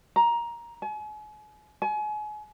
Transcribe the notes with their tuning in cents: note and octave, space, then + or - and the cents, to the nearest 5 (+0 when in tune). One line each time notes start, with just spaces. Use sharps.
A#5 +15
G#5 +40
G#5 +35